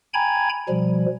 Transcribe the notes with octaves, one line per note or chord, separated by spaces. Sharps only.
G5 G#5 A#5 B5 G#6
B2 F3 G3